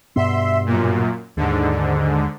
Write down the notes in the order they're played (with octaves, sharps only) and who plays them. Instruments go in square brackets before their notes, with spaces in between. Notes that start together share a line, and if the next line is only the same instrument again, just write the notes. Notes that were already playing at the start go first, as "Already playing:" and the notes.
[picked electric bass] G2 B2 B3 [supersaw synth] E5 C6
[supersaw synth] F#2 A#2
[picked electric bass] D#2 [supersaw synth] G#2 D3